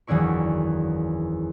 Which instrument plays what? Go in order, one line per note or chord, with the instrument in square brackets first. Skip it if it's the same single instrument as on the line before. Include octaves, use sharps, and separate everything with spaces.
[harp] F#1 E2 D#3 D4 E4 C#6